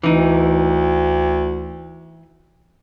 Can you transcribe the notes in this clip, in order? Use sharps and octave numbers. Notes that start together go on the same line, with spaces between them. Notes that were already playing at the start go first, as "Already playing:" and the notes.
D2 E3 D#4